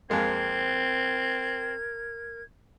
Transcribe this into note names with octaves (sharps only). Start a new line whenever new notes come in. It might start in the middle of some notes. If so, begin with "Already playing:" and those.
F2 G#3 A#3 C4 A#4 G#6